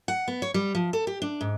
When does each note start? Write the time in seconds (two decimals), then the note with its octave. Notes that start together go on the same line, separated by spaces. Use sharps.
0.08 F#5
0.28 B3
0.42 C#5
0.54 G3
0.75 F3
0.93 A4
1.07 G4
1.22 D4
1.41 G#2